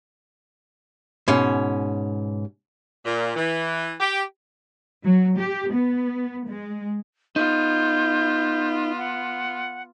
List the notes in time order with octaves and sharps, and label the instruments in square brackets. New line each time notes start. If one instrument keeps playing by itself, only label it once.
[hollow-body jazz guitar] G#2 B2 C#4
[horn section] A#2
E3
G4
[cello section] F#3
G4
B3
G#3
[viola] B3 F4 [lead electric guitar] D#4 [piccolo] G6
[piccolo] F#5